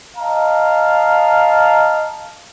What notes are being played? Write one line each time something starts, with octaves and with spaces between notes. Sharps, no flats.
D#5 F5 A5 A#5